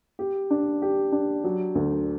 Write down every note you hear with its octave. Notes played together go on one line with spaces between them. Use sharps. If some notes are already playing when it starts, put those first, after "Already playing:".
G4
D4
G4
D4
F#3
D2